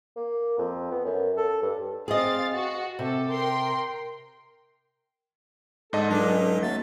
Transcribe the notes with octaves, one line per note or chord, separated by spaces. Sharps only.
A#3
F2
B3
F#2
A4
G2
C4 G#4 D#5 F5 A6
F#4
C3 A4
A#4 G5 C6
G#2 D3 A4 D#5
C#2 F#3 D4 A4
C#4
F#3 A3 A#3 E5 A6